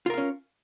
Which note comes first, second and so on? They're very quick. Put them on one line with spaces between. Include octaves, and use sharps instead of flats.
F4 A#4 F5 C#4